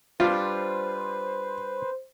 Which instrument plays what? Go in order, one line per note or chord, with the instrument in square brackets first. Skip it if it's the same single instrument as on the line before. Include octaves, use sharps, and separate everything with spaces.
[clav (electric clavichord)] G3 D4 [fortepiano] F4 [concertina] B4 [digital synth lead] C5